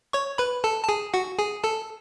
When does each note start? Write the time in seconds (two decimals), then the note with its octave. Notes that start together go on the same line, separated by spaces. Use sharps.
0.13 C#5 C#6
0.38 B4 B5
0.64 A4 A5
0.84 A5
0.89 G#4 G#5
1.14 F#4 F#5
1.39 G#4 G#5
1.64 A4 A5